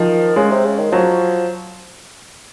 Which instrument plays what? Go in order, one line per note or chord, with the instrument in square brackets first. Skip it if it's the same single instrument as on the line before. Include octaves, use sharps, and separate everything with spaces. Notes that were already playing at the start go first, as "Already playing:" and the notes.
Already playing: [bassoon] D#3 [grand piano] F3
[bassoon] C#3 [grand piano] G#3
[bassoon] C3
C#3
D#3
[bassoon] F3 [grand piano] F#3